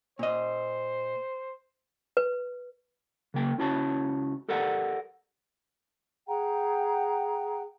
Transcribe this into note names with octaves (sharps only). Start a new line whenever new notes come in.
A#2 C5 D#5
B4
C#3 F#3 A#3 G5
C#2 C#4 E4 F#4 C#5 A5
G4 A4 A#4 D5 F#5
G#4 F#5 G5 A#5